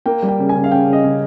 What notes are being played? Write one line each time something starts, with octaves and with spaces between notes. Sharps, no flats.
A#3 G5
G3
G5
C#3
G#5
C#3
F5
C#3 G5
C#3
D#5
C#3